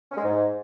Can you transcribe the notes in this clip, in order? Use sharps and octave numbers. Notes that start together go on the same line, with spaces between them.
C#4
G#3
G#2